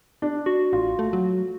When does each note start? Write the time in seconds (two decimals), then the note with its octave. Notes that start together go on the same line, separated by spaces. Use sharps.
0.22 D4
0.46 F#4
0.73 A1 F4
0.99 A3
1.13 F#3